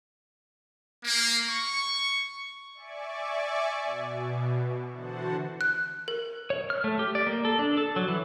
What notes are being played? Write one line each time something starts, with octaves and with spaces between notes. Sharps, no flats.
A#3
C#6
D5 E5 G#5 C#6 D6
B2
D3 E3 F#4 C5 F#5 A5
F#6
A#4
C#5
F6
A3
G4
D5
A#3
A4
D4
A4
F#3
E3